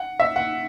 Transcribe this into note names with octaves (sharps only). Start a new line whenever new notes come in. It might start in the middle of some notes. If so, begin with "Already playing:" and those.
Already playing: F#5
E5
F#5